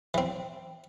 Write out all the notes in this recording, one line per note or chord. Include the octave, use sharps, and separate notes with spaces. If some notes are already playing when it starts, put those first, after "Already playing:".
E3 C4